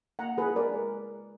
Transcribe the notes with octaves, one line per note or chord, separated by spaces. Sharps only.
A#3 F#5 A#5
F4 G#4 B4
G#3 A#4 D5